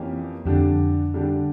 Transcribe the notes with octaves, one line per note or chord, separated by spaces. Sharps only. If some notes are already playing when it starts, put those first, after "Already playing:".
Already playing: F2 E3 A#3 C#4 G4
F2 D3 G3 D4 G4
D3 G3 D4 G4